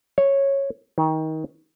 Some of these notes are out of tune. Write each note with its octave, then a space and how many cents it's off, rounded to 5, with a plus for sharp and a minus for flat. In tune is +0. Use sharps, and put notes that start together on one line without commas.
C#5 -10
D#3 +25